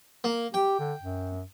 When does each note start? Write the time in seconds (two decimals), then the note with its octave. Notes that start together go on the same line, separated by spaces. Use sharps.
0.24 A#3
0.54 G4 G5
0.79 D3
1.02 F#2